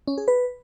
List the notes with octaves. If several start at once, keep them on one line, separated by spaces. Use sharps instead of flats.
C#4
G#4
B4